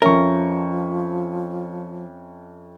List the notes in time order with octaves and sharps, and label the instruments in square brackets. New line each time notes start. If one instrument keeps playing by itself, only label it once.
[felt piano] F2 C#4 [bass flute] F3 [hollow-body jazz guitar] A#4 [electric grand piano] E5 C#6